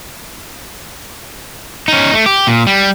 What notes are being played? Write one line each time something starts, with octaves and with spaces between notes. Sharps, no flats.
C#4 D#4
A3
G4
A#2
G3